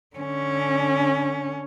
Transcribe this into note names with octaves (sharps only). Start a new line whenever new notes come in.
D3 C#4